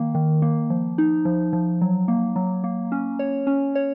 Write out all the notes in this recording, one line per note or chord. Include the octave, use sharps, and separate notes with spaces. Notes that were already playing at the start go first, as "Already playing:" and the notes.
Already playing: D#3 A#3
D#3
A#3
F3
D#4
F3
F3
F#3
A#3
F#3
A#3
C#4
C#5
C#4
C#5